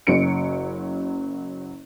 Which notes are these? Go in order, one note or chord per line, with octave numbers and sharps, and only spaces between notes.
F#1 F#3 C#4 C#7 D7